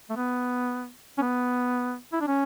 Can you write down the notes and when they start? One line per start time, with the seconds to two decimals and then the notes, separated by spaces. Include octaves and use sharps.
0.10 A3
0.16 B3
1.18 C#4
1.22 B3
2.13 E4
2.21 D4
2.28 C#4